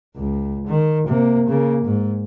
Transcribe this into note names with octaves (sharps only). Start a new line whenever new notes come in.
C#2
D#3
C3 A#3
C#3 A#3
G#2